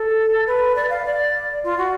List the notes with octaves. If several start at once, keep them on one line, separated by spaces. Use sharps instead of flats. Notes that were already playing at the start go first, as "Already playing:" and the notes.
Already playing: A4
B4
D5
F5
D5
F4
F#4